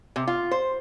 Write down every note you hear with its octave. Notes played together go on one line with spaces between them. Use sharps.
C3
F4
C5